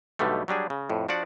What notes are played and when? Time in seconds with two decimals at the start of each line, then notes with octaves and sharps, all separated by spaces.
0.19 B1 B2 D3 G3 A3
0.48 F#3 G3 D4 G#4
0.70 C#3
0.90 F2 A2
1.09 F3 D4 F#4 D5 F#5